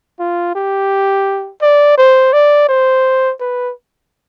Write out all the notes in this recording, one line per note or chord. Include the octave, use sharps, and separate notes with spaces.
F4
G4
D5
C5
D5
C5
B4